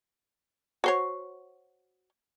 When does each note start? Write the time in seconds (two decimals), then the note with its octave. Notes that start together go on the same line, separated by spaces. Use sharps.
0.84 F#4 C5 C#5